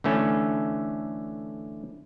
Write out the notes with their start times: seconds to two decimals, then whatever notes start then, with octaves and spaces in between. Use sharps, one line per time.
0.04 D3 E3 A3 C#4